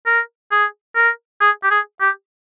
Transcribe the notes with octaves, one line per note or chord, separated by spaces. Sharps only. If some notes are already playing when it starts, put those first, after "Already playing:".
A#4
G#4
A#4
G#4
G4
G#4
G4